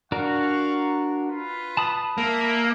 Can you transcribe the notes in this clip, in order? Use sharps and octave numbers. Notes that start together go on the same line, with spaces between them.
D4 F#4 A#4 F5 F#5 C#6
F4 B4
A5 B5 D#6
A#3 E5